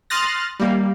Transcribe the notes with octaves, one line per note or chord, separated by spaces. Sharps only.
C6 D#6 F6 F#6 A6 A#6
G3 A#3